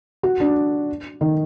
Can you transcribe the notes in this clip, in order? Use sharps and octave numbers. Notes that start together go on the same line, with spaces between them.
F#4
D4
D#3